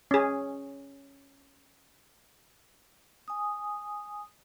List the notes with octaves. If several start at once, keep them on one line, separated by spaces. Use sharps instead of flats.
C#4 G#4
G#5 D#6